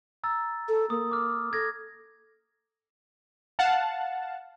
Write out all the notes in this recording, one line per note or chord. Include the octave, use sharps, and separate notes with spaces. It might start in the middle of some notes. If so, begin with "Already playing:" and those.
A#5 E6 A6
A4
A#3 D#6
D6 F6
A4 G#6 A#6
F5 F#5 A5